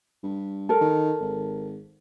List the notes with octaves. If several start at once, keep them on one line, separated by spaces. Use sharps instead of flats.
G2
A4 A#4
D#3
G#1